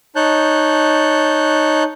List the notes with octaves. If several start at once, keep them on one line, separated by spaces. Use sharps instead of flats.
D#4 C#5 A5 F#6 G6